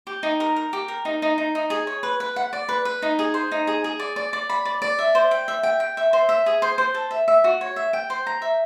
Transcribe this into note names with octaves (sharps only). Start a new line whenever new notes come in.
G4
D#4
A#4
A#4
G4
A#4
D#4
D#4
D#4
D#4
G#4
C#5
B4
B4
F#5
D5
B4
B4
D#4
G#4
C5
D#4
G#4
G#4
D5
D5
D5
B5
D5
D5
E5
C5
G5
E5
G5
G5
E5
C5
E5
G#4
C5
C5
A4
E5
E5
F#4
C#5
E5
G5
C5
A#5
E5